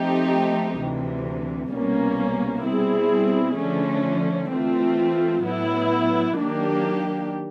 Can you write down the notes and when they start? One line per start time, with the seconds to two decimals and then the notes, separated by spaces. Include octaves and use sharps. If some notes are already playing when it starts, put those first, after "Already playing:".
Already playing: F3 A3 C4 D#4 G4
0.78 D2 C3 E3
1.72 C2 B2 G3 A#3 C#4
2.65 B2 G3 C4 E4 G#4
3.57 D3 F3 A3 C#4
4.50 E3 A3 C4 F4
5.43 A2 F#3 B3 E4
6.36 D#3 F#3 A#3 D4 G4